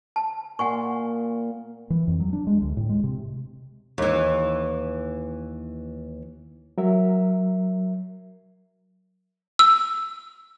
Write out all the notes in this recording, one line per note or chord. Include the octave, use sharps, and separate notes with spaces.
A5
A#2 F#5 G#5 C#6
E3
F2
F#3
D4
G#3
D2
A2
G#3
C3
D#2 E3
F#3 A#4 E5
E6